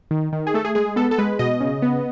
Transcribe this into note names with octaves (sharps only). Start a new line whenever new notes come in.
D#3
D#3
G#4
A3 A4
G#4
G#3 G#4
B3 A4
A4
G#3 B4
B2 D#5
C#3
B3